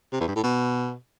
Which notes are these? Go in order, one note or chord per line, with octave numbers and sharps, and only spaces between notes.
C3
E2
G2
A2
B2